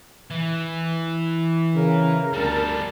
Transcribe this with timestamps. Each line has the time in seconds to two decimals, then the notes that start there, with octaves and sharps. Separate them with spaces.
0.31 E3
1.75 C#3 A#4
2.33 D2 G3 A4